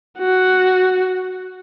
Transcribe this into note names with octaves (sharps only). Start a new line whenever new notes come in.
F#4